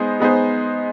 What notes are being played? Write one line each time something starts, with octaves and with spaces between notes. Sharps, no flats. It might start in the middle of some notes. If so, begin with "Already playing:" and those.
Already playing: G#3 B3 D#4 G#4 C5
G#3 B3 D#4 G#4 C5